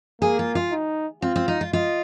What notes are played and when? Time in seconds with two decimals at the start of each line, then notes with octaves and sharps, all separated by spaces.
0.21 A#3 G#4
0.39 F4
0.55 F4
0.72 D#4
1.22 C4 F4
1.36 C4
1.48 D#4
1.61 F4
1.73 F4 D#5